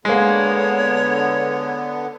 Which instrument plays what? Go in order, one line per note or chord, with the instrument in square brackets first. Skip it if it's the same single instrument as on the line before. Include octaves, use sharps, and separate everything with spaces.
[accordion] D3 B3 [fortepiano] G#3 A#3 [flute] C#5